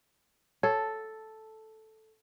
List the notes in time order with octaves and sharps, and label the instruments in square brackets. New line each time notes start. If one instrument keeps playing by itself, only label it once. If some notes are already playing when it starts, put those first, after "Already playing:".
[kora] A4 [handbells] C#5